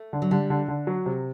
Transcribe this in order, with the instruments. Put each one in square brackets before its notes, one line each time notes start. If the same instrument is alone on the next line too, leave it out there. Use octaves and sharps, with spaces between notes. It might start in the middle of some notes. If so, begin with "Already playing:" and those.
Already playing: [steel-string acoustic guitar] A3
[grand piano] D3
[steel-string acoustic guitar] F#3
[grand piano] D3 [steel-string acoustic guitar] G3
[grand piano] D3
D3
F#3
C3